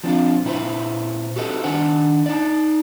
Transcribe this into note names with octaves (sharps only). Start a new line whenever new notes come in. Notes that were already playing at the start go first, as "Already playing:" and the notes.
F3 C4 D4 F4
A#2 E4 B4 C5
F#4 G4 A4 B4 C5 D#5
D#3 D4 F#5 G#5
D#4 D5